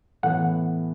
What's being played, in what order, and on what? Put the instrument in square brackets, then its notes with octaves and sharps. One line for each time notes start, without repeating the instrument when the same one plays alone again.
[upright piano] A2 E3 B3 [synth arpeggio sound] F#5